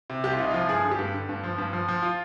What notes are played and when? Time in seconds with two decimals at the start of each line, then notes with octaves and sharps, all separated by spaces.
0.10 C3
0.24 C2 G4
0.33 F4
0.39 C2 D#4
0.51 F3 F4
0.69 G2 G#4
0.84 D3
0.91 G4
0.99 G2
1.14 D3
1.29 G2
1.44 F3
1.58 G2
1.73 F3
1.88 F3
2.02 F4